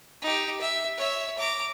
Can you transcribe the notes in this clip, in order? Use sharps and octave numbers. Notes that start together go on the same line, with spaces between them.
D#4 G4
E5
C#5 E5
A#5 D6